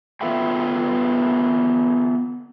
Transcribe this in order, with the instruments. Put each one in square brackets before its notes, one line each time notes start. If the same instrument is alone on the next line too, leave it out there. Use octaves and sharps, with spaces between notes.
[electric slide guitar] B3 F4 A4 B4 E5 G5